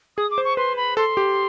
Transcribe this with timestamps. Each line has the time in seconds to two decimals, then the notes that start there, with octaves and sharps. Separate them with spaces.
0.17 G#4 D#6
0.31 D6
0.38 C5
0.45 C#6
0.57 B4 C6
0.77 B5
0.97 A4 C6
1.17 G4